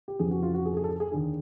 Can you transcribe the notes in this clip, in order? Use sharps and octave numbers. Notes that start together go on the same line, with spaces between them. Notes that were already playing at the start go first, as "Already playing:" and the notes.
G4
F2 C#3 E3 G#4
F#4
F4
F#4
G#4
A4
G#4
A4
G#4
G#4
D#2 D3 G#4